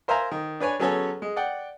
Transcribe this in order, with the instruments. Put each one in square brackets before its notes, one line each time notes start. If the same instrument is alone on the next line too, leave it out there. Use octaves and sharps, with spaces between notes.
[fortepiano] A#4 C5 E5 F5 G#5 A#5
D#3
D4 B4 C#5 G#5
F#3 B3 C#4 G#4 A4 C#5
G#3
D5 F#5 G5